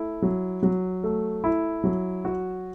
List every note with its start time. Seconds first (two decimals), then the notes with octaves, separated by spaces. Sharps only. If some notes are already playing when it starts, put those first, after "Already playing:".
Already playing: A3 E4
0.22 F#3
0.63 F#3
1.04 A3
1.44 E4
1.84 F#3
2.25 F#4